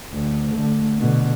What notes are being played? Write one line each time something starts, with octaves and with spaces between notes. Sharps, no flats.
D2
D3 A3
B2 D3